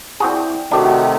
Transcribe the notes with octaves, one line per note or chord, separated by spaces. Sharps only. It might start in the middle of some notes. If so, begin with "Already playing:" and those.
C4 E4 F#4 G#4 D5 G5
C3 D#3 A3 D4 F#4 G4